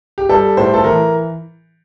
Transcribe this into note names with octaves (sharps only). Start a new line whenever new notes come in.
G4
G3 A4
A2 C5
A4
E3 A#4